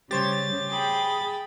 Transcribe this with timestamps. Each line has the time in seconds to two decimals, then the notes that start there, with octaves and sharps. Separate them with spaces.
0.11 C#3 G3 G4 C5 C#5 A6
0.70 G#4 G5 B5